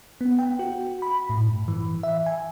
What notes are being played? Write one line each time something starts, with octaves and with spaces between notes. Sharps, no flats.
B3
G5
F#4
B5
A2
G2
E3
E5
G#5